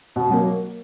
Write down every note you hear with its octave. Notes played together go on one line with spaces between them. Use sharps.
B2
F#3 A#3